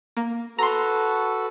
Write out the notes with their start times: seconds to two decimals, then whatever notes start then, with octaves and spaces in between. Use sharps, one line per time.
0.17 A#3
0.59 F#4 A4 B4 A#5 C6